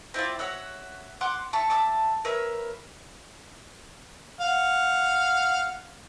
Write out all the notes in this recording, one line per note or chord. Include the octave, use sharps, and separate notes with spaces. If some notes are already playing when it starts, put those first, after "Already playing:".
C4 E4 F4 D5
F#4 C#5 E5 F#5
F#5 C6 D6 F#6
E5 A5 C#6
E5 A5 D6
A#4 B4 C#5 E5
F5 F#5